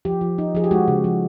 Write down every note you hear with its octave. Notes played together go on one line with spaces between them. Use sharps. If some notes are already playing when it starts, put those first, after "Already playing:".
F3 G4
F3
D#4
F3 G#4
G4
G#3 F#4
C#3
F3